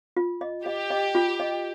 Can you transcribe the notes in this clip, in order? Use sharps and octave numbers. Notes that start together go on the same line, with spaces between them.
F4
D#5
G4 D#5
D#5
F4
D#5